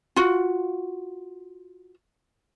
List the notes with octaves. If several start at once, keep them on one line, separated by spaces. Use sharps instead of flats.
F4 F#4